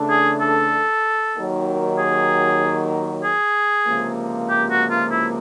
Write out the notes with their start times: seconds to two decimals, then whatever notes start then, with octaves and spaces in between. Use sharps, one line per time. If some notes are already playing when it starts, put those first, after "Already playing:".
Already playing: C#3 E3 A3 D4
0.10 G#4
0.41 A4
1.35 D#2 D#3 F#3
1.98 G#4
3.24 G#4
3.86 C#2 C3 F3 A#3
4.49 G4
4.70 F#4
4.91 F4
5.11 E4